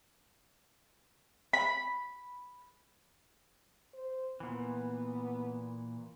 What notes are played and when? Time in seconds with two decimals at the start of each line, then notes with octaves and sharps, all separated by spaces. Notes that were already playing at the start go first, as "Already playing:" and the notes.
1.53 B5
3.94 C5
4.40 A#2 E3 B3